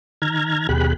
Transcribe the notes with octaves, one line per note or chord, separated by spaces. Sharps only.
D#3 A#5 F6 G#6
D#2 B2 G4 G#4 B5 F#6